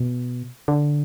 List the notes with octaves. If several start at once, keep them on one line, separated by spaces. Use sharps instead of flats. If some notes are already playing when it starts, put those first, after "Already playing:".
Already playing: B2
D3